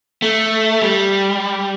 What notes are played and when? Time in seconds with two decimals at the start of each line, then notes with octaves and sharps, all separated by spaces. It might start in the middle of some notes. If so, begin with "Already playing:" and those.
0.22 A3
0.82 G3